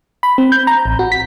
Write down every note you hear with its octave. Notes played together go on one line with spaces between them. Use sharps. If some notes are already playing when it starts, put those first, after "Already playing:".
B5
C4
G6
A#5
A1
F#4
B6